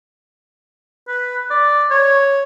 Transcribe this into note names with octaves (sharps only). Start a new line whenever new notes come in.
B4
D5
C#5